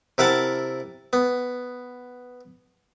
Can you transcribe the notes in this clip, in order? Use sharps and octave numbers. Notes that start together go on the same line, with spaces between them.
C3 E4 A#4 F#5 A5
B3